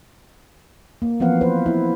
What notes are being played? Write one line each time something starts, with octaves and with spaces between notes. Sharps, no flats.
A#3
E3 F3 B3 C4 F5 F#5
B4 C5
E4